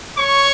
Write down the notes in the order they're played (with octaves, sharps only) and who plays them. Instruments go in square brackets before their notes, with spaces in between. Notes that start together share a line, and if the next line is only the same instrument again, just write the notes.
[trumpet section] C#5 C#6